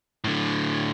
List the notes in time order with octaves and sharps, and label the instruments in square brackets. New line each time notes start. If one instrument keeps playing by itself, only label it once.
[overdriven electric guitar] A2 D3